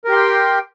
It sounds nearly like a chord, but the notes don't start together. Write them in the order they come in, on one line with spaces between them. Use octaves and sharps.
A#4 G4 C6 G5